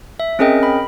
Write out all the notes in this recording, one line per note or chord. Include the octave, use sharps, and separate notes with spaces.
E5
C4 C#4 G#4 A#4 D#5 G5
B5